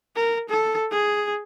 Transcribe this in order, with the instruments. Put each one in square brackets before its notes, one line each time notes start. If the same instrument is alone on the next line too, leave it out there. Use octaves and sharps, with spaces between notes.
[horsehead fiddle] A#4
A4
G#4